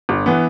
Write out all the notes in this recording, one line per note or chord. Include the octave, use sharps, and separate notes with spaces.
G1
E3 B3